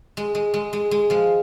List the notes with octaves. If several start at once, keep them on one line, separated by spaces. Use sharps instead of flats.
G#3
G#3
G#3
G#3
G#3
F3 G#3